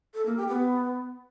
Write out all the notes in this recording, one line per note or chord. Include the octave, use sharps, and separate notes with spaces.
A4
A#3
G4
B3